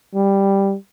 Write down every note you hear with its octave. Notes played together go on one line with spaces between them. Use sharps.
G3